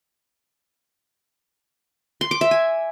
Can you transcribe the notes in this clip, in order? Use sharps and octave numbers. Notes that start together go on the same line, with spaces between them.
C6
D6
E5
G#5